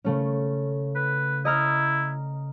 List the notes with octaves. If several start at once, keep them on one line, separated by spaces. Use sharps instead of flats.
C#3 A3 C#4
B4
E4 D#5 A#5 F6